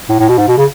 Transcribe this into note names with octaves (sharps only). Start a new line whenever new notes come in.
A2
A2
B2
G#2
B2
C#3